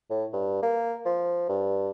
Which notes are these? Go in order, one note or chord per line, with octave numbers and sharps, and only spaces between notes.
A2
G2
A#3
F3
G2